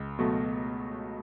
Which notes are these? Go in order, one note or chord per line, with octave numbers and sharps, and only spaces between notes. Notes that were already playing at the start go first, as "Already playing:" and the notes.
Already playing: C#2
B2 F#3 A3